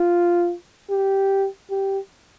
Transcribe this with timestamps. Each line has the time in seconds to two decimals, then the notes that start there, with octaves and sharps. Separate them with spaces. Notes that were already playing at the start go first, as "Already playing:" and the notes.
Already playing: F4
0.90 G4
1.71 G4